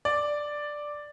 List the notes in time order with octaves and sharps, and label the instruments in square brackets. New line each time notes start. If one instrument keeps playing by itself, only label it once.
[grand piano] D5